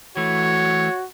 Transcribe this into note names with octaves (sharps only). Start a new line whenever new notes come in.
E3 A3 F#4 C#5